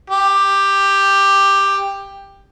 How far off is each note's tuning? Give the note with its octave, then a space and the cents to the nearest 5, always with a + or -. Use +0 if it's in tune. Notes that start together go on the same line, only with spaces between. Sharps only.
G4 +10